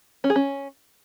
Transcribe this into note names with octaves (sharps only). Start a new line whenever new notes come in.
C#4
G#4
C#4